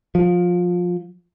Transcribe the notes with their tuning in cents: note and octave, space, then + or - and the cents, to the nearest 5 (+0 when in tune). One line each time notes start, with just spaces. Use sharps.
F3 +20